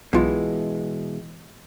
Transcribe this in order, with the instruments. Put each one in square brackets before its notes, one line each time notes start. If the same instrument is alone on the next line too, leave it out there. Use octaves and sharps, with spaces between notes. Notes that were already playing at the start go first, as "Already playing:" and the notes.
[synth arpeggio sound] B1 F4 [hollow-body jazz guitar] B2 E3 G#3